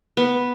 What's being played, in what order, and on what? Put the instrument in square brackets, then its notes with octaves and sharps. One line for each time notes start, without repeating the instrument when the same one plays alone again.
[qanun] B3